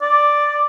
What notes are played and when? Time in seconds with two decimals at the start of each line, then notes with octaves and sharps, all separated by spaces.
0.02 D5